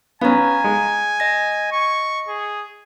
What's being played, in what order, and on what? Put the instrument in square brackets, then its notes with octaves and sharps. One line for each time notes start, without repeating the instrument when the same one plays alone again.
[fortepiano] B3 C#4 [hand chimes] F5 A#5 [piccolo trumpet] G#5
[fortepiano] G#3
[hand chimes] D#5 A#6
[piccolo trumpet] C#6
G#4